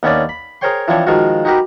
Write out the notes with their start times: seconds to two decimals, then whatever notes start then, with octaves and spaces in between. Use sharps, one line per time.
0.03 D#2 B3 C#4 D4 D5
0.29 B5
0.61 G#4 A#4 C5 C#5 G5 C6
0.88 E3 F3 C4 D4 C#5
1.07 D#3 F3 G#3 F4 F#4
1.45 D#4 F#4 G4 A#4 B4